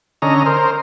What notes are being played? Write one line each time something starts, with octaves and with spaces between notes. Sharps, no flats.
D3 C#4 D#5 A#5
A#4 C5